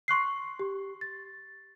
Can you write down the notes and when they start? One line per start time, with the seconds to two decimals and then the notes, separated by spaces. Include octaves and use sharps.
0.08 C6 C#6 F#6 C7
0.59 G4
1.01 A6